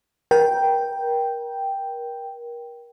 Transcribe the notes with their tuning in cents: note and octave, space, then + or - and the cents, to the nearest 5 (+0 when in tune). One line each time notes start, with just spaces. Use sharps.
A#4 +30 G5 +0